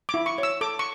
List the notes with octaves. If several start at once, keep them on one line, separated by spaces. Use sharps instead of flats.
D6
E4
C#6
C#5
E6
A4 D6
C#6